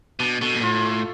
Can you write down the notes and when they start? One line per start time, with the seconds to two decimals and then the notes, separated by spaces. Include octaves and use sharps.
0.20 B2 D4
0.41 B2 A3
0.55 A#2
0.63 A2 F4
0.85 A3